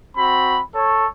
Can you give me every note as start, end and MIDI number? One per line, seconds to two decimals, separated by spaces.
0.17 0.59 60
0.17 0.59 66
0.17 0.59 83
0.75 1.07 69
0.75 1.07 73